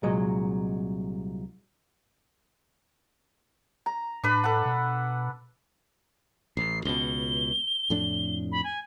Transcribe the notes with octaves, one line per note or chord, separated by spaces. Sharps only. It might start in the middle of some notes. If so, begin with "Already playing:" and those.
C2 A#2 F#3 G#3 D#5
A#5
A2 D4 B4 B5
A4 F#5
B2
A1 C7
C#2 B2 G7
F2 A2 D4
B5
G#5